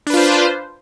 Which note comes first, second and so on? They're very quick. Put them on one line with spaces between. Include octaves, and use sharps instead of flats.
D4 B4 F4 C5